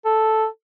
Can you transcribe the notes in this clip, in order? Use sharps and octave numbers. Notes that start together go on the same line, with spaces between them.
A4